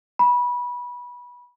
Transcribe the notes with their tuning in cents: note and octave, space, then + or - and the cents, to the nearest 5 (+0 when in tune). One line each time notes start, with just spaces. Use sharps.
B5 -20